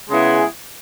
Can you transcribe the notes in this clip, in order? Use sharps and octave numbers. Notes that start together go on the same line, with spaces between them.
C#3 G#3 B3 E4 G#4